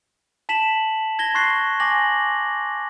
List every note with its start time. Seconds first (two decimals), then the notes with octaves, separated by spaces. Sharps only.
0.49 A5 B6 E7 F#7
1.19 G#6 A#6 G7
1.35 C6 C#6 F#6 A6 C7
1.80 G#5 D6 A#6 F#7